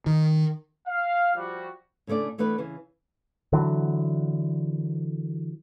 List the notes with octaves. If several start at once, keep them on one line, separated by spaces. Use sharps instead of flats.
D#3
F5
F3 G3 F#4
A2 C#3 A3 D4 D5
E3 A3 B3 D4 B4
C#3 E3
D3 E3 F#3